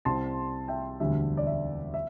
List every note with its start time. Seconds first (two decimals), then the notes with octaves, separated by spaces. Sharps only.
0.05 C2 C3 G3 C4 A5 C6
0.68 E5 G5
1.00 E1 D2 D3 G3 E5
1.37 D5
1.47 E5
1.94 E5